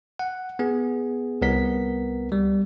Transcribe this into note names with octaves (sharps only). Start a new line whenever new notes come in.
F#5
B3 G#4
C2 B3 A#4 B6
G3